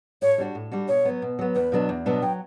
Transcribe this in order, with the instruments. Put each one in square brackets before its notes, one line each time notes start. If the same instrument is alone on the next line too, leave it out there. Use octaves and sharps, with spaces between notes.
[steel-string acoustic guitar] A2 [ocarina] C#5
[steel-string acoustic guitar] G3 D4 F#4
A2
G3 D4 F#4
[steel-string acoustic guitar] B2 [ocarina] C#5
[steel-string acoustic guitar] F#3 B3
B2
F#3 B3
[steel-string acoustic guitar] E2 [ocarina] B4
[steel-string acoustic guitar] B2 F#3 B3 D4
E2
B2 F#3 B3 D4
[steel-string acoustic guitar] F#3 [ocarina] G5